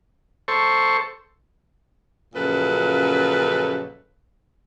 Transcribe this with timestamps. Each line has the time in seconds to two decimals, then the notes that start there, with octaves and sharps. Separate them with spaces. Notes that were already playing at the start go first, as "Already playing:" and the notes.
0.48 A4 C5 C#6
2.35 F#2 A#2 C#3 F3 A4 B4